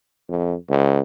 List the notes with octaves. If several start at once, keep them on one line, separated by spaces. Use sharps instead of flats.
F2
C#2